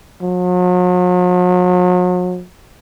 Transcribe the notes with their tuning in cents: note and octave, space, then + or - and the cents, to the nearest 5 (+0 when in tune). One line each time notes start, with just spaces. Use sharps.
F#3 -45